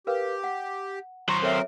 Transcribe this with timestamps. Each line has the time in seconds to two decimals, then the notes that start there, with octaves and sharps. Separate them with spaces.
0.07 G4 A#4 B4 F5
0.44 F#5
1.29 F#3 C5 A#5 C#6
1.43 C4 A4 A#4 C#5 E5